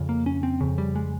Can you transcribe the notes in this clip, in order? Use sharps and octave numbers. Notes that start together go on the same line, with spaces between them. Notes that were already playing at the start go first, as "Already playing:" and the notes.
Already playing: F2 C#3
A#3
C#4
C4
F2 C#3
G3
G#3